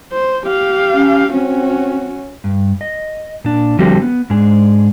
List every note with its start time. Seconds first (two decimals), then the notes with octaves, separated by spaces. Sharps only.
0.12 C5
0.46 G4 F5
0.94 C#4
1.31 C4 C#4 F#4
2.44 G2
2.81 D#5
3.44 A#2 D4
3.79 D3 F3 G3 A3 C4 F#4
4.02 B3
4.30 G#2 G#3 D4 G#4